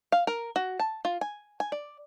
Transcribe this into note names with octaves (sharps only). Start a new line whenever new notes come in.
F5
A#4
F#4
A5
F4
G#5
G#5
D5